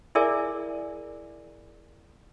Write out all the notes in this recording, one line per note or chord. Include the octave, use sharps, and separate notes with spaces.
E4 G#4 A#4 D5 E5 G#5